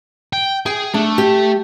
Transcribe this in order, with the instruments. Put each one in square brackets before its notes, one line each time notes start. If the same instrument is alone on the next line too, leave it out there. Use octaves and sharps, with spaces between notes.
[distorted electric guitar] G5
[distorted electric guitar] G#4 [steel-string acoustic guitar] G5
[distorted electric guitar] A3 [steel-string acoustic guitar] D4
[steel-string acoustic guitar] G4